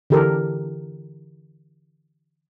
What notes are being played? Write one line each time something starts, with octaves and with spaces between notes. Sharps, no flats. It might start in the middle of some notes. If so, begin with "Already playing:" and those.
D3 E3 G4 A4 A#4